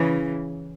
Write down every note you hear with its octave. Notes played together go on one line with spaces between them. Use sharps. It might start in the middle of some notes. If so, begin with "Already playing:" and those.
Already playing: C#3 E3